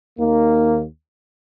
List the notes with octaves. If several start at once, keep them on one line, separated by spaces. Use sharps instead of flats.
D#2 D#3 A#3